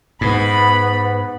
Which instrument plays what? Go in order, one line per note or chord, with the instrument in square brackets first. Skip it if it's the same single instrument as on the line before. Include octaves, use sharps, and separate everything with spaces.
[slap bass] G#2 [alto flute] B3 [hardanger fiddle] B5